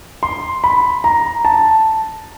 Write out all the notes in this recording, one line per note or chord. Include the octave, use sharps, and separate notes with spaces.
C6
B5
A#5
A5